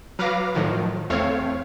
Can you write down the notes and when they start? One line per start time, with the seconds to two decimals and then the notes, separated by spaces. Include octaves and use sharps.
0.19 F#3 B4 F5 D6 A#6
0.54 A2 D#3 F3 F#3
1.10 E2 A3 C4 C#5 F5